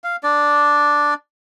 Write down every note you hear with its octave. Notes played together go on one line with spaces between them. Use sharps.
F5
D4 D5